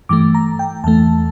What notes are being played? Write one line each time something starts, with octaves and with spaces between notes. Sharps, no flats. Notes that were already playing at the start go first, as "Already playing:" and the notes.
G2 E3 A3 D6
A#5
G5
E2 E3 A3 A5